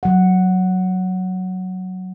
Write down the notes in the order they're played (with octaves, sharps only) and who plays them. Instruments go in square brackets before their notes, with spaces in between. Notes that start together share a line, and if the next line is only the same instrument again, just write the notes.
[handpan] F#3 F#5